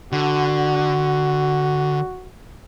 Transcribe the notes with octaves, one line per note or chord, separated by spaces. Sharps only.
D3 F#4